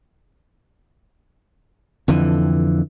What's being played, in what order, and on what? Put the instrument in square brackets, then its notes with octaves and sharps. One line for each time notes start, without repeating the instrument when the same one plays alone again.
[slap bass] F2 D3 E3